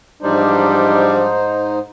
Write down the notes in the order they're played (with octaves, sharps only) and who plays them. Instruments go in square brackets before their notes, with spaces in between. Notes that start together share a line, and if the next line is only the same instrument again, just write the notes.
[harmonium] G#2 D#4 C5 [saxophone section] E3 F3 G3 [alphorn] D4